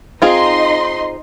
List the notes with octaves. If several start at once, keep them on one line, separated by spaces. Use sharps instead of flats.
C4 D#4 F4 G#4 D#5 C6